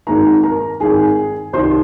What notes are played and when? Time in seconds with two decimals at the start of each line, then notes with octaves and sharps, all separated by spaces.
0.07 G#1 G#2 D#3 A#4 A#5
0.43 A#4 A#5
0.80 G#1 G#2 D#3 G#4 G#5
1.53 C2 C3 D#3 C5 C6